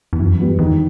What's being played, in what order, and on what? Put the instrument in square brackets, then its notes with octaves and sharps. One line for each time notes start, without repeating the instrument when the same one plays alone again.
[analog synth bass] E2
[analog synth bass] F#2 [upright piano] E3
[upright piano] G3 B3
[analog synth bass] E2 [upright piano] D#3